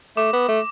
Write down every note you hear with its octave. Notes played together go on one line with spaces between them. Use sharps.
A3 D6
B3
A3